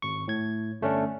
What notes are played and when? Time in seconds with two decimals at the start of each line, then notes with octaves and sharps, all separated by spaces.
0.02 G#1 C#6
0.28 A2 G#6
0.81 G1 A3 C#4 D4